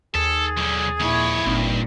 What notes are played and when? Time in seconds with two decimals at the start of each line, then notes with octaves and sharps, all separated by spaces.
0.15 D#2 G#4 A4
0.57 B1 D3
1.00 F2 A#2 E4 C#5
1.46 G1 D2 G2 A#2 C4 D#4